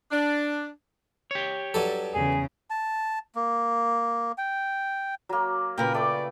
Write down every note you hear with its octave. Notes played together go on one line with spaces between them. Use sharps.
D4
G4 C#5
G2 F#3 A4
E2 C#3 G#4
A5
A#3
G5
F#3 A#3
A#2 C#3 A#4 B4 G5
A3 D5 D6